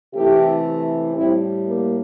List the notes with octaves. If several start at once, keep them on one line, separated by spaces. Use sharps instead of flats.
C3 E3 A3 E4 G4
A2 G3 C4 E4
A#3